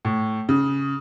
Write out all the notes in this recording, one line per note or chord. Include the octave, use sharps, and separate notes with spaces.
A2
C#3